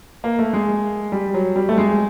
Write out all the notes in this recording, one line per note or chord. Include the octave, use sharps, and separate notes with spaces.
A#3
A3
G#3
G3
F#3
G3
A3
G#3